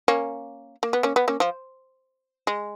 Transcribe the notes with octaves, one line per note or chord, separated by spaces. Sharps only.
A#3 C#4
A#3
B3
A#3 C#4
B3
A#3 C#4
F3
G#3